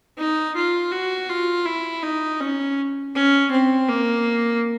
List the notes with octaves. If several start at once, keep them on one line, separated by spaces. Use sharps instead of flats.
D#4
F4
F#4
F4
E4
D#4
C#4
C#4
C4
A#3